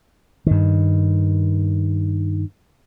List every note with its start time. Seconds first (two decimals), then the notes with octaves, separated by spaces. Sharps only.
0.47 G2 D#3